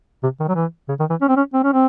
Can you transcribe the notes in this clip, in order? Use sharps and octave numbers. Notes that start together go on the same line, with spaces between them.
C3
D#3
F#3
E3
C#3
D#3
E3
C#4
C4
C#4
C4
C#4
C4